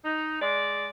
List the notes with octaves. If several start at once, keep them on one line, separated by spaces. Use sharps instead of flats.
D#4
G#3 D5